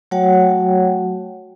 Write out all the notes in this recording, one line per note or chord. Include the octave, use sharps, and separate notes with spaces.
F#3 A3 F#4 C#5 F#5 G5